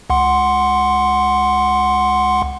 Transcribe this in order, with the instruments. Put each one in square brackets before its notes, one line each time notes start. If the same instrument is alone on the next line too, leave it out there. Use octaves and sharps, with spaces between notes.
[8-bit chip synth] C#2 F#5 C6